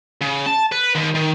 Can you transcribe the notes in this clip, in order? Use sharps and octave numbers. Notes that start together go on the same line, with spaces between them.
C#3
A5
B4
D#2
D#3